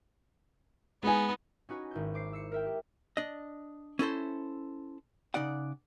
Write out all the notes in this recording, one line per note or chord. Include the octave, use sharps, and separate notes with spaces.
G#3 B3 D#4 G#5
C#4 D#4 F#4 B4 G#5
G#1 E4 G6
C5 D6 C7
E6 C7 C#7
A#4 E5 G5
G4
D4 D#5
C#4 E4 A4 C5
C#3 D#4 D5 F#5